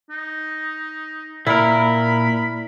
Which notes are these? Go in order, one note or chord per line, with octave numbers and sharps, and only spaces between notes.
D#4
A#2 E4 A#4 B5